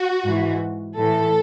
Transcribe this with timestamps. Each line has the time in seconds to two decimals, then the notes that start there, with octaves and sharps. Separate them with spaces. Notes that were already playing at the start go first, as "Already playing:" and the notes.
Already playing: F#4
0.23 G#2 E3
0.97 A2 E3 A4